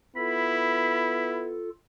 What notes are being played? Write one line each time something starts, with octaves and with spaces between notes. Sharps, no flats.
B3 E4 F4 A4 B5